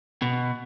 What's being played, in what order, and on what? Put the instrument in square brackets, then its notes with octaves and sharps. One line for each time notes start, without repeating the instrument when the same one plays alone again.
[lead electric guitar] B2